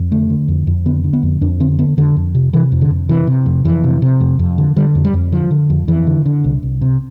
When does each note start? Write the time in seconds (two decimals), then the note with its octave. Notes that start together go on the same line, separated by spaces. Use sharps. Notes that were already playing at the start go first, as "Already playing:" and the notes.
Already playing: F2
0.11 D3 A3
0.30 D3
0.48 F2
0.67 F2
0.86 D3 B3
1.04 D3
1.13 B3
1.23 F2
1.41 F2 D4
1.60 D3 C4
1.79 D3 B3
1.97 F2 D3
2.16 F2
2.35 C3
2.53 C3 E3
2.72 F2
2.81 D3
2.90 F2
3.09 C3 E3
3.27 C3
3.46 F2
3.65 F2 E3
3.84 C3
4.02 C3
4.20 F2
4.39 F2
4.58 D3
4.76 D3 G3
4.95 F2
5.04 G3
5.14 F2
5.32 D3 F3
5.51 D3
5.70 F2
5.88 F2 E3
6.07 D3
6.26 D3
6.44 C2
6.63 C2
6.81 C3